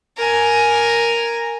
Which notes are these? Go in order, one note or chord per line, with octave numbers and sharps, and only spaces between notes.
A#4 G#5